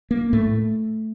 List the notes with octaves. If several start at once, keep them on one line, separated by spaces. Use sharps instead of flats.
A#3
A2 A3